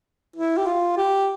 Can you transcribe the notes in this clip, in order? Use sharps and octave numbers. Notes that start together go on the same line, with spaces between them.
E4
G4
F4
G4